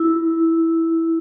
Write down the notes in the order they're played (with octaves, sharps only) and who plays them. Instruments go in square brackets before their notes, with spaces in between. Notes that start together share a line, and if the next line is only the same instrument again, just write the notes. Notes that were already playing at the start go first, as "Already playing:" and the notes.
Already playing: [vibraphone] E4